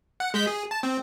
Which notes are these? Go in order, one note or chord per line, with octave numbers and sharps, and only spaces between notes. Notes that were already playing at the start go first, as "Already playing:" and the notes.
F#5
G#3 G6 B6
G#4
A5
C4